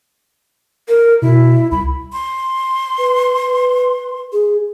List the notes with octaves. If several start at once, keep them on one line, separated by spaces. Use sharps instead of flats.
A#4
B2 E4
C2 B5
C6
B4
B4
G#4